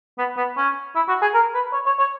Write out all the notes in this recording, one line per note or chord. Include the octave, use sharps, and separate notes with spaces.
B3
B3
C#4
E4
F#4
G#4
A#4
B4
C#5
C#5
C#5